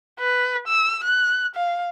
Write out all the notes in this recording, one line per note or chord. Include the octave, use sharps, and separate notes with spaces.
B4
E6
F#6
F5